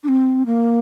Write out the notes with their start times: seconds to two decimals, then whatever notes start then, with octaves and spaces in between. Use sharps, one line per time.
0.03 D4
0.08 C4
0.46 A#3